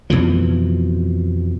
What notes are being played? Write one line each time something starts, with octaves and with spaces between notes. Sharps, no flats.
F2 B2 E3 F3